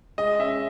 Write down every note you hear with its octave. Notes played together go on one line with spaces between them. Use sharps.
G#3 D#5
C#4 E5